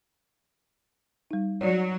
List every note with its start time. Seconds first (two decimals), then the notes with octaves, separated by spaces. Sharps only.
1.31 G3 D#4
1.61 F#3 C#5 D5